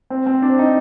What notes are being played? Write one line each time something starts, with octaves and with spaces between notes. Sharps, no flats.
C4
C4
D4
D#4